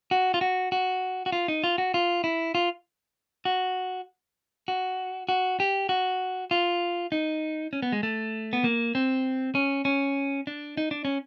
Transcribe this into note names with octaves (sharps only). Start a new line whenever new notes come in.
F#4
F4
F#4
F#4
F#4
F4
D#4
F4
F#4
F4
E4
F4
F#4
F#4
F#4
G4
F#4
F4
D#4
C#4
B3
G#3
A3
B3
A#3
C4
C#4
C#4
D4
D#4
D4
C#4